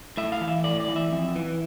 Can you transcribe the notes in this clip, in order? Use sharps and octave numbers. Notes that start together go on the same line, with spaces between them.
A2 E5
F5
E3
E5
A2 D5
D5
E3
E5
F2
E3